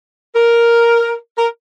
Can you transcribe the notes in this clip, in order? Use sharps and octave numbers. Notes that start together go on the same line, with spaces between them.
A#4
A#4